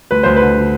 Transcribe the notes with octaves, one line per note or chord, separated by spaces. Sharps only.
D2 B4
D2 C5
B4
D3
D3